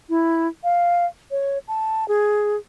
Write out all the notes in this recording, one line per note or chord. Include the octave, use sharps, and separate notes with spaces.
E4
F5
C#5
A5
G#4